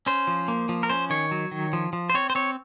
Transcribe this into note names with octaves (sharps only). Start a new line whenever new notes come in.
C#4 C5
F3
A#3
F3
A#4
C#4 C5
D#3 C#5
F#3
D#3
F3
F3
C5
C4 C#5
C5
C4 C#5